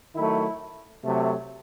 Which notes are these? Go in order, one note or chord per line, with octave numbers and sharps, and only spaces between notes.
D#3 F#3 A3 E4
C3 F#3 A3